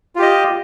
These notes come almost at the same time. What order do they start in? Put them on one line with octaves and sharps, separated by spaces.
F4 G4 D#5